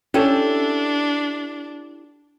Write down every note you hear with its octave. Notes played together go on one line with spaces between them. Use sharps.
C#4 D4 E4 G4 A4